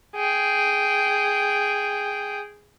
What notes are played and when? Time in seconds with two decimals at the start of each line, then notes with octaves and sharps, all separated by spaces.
0.16 G#4 G5